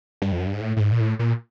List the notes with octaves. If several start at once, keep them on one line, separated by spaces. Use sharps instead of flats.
G2
F2
F#2
G2
G#2
A2
A2
G#2
A#2
A2
A#2